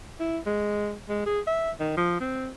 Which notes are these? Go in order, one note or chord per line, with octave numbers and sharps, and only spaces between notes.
E4
G#3
G#3
G#4
E5
D#3
F3
C4